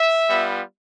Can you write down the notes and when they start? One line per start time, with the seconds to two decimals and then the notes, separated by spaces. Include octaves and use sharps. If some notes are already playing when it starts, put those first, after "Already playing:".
Already playing: E5
0.28 G3 B3 F4